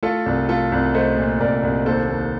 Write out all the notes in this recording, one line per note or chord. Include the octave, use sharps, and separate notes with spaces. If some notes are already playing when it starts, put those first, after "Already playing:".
A3 F4 A4
C2
A3 F4 A4
C2
A3 C5 D#5
A#2
C2 A#4 D5
C2
D#2 A4 C5
D#2